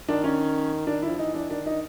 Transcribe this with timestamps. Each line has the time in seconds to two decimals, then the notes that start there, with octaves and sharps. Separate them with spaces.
0.08 D#3 D4
0.24 C#4
0.87 D#3 D4
1.03 E4
1.09 F3
1.19 E3 D#4
1.35 D4
1.50 D#3 D4
1.66 D#4